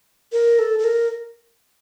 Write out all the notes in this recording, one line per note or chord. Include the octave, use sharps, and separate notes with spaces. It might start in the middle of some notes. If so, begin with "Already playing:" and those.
A#4
A4
A4
A#4